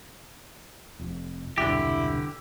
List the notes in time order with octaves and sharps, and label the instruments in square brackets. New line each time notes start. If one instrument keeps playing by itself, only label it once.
[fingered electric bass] F1 F2
[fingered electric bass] E1 C2 G2 [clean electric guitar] D3 G4 [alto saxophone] E4